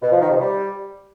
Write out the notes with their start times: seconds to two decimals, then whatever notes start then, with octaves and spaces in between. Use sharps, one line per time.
0.02 B2
0.11 F3
0.21 D#3
0.30 C3
0.40 G3